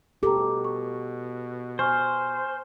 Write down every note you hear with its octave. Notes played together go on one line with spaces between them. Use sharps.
B2 G4 A4 A#5 D6
C#6
C5 G#5 C#6 F6